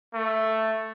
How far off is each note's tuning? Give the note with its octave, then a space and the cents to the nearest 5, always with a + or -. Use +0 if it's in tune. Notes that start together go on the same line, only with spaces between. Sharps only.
A3 +5